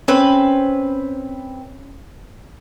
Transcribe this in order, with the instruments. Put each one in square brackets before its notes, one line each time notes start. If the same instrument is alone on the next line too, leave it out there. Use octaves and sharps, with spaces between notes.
[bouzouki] C4 B4 [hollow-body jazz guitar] C#4